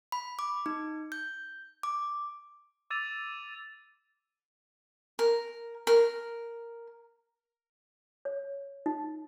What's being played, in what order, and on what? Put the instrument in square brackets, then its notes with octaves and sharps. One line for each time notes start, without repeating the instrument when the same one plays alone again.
[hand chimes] B5
D6
D#4
G6
D6
[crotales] D6 E6 A6 D#7 F7
[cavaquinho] A#4
A#4
[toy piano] C#5
D#4